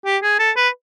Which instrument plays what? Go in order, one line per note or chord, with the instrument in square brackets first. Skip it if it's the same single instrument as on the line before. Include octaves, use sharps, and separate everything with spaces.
[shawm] G4
G#4
A4
B4